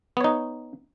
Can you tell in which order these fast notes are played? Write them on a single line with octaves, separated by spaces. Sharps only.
B3 C#5 D#4